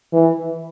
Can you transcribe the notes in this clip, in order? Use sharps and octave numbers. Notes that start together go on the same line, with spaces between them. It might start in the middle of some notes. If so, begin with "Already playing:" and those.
E3